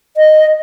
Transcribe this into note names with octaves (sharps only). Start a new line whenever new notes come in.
D#5